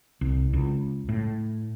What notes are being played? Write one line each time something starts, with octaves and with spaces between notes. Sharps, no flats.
C2
C#2
A2